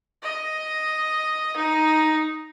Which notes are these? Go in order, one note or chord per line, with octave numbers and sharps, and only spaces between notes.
D#5
D#4